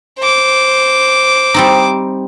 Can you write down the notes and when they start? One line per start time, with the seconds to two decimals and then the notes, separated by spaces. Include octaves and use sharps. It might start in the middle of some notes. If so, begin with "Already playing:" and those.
0.19 C5 D6
1.54 G3 C4 D#4